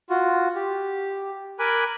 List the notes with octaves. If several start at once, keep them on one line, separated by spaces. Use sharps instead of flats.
F4 F#4
G4
A#4 G#5 B5 D6 F#6